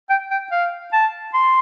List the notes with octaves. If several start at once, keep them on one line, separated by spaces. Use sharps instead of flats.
G5
G5
F5
A5
C6